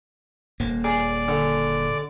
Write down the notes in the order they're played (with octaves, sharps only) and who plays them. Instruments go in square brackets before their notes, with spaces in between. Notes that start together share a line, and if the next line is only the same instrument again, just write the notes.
[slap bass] D#1 A#3
[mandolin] G#4 [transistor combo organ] D5
[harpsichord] D3